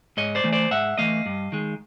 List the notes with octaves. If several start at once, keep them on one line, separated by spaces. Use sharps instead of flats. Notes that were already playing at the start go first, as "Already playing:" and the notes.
G#2 C#5 D#5
C5 D5
E3 A3
C5 D5
G#2 E5 F#5
E3 A3 D#5 F5
G2
D#3 G#3